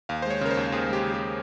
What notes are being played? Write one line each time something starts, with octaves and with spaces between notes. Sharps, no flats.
D#2 F5
C5
G#3 C#5
C#3 A#4
C5
D#2
D#2 G#4
G#3 G4
C#3
G4